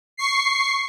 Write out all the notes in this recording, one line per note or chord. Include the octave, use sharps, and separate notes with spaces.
C#6 C7